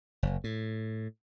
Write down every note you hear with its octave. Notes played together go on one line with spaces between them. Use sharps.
F#1
A2